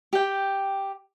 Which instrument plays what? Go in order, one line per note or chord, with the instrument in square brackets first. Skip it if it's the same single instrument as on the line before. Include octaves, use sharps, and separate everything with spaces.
[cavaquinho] G4 G5